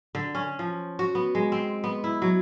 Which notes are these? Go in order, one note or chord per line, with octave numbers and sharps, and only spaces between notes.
D3
C#4
F3
F#4
B3
G#3
C4
B3
E4
F#3